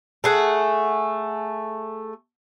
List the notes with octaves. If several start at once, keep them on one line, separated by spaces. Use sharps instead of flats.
A3 G#4 F#5